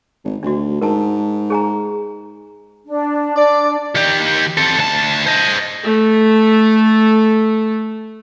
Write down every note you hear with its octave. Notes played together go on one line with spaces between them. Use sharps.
G#1
D2 D4 F#4
G#2 A#4 A5
G#4 G#5 A#5
D4
D4 D5
D#3 G4
C4 A4
D2 A5
C5 D#5
A3 A4